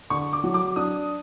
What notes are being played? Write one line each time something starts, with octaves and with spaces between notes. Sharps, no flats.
D3 C#6
D6
F#3
D6
D4 D#6